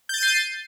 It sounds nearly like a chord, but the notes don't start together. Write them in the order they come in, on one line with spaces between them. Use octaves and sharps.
G6 A6 D#7 C7